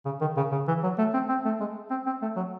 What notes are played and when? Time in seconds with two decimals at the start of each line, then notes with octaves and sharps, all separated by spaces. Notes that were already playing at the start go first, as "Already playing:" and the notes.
0.06 C#3
0.21 D#3
0.37 C#3
0.52 C#3
0.68 E3
0.83 F#3
0.98 A3
1.14 C4
1.29 C4
1.45 A3
1.60 G#3
1.90 C4
2.06 C4
2.22 A3
2.36 F#3